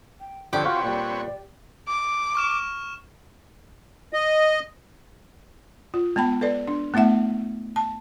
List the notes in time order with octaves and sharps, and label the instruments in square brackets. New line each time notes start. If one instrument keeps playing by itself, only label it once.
[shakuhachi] G5
[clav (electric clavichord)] F2 D3 [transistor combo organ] C4 B4 C#5 [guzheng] G4 [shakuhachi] G5
[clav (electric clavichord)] F4 F#4 [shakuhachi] C6
[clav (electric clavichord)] A#2 G3 [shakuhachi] D5
[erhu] D6
[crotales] C#6 F6 E7
[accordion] D#5
[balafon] F4
G#3 B3 G5 B5
A4 B4 D5
D4
A3 B3 E4 E5 F#5
A5